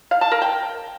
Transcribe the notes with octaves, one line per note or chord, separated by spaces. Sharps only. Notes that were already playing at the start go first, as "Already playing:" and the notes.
F5
A5
A#4
G5